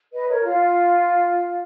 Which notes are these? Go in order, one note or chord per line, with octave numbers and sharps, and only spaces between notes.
B4 D#5
A#4 C#5
F4